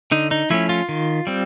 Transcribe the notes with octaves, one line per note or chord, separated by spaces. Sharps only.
D3 D#4
D#4
F3 A3 C#4 E4
F4
D#3
G3 C4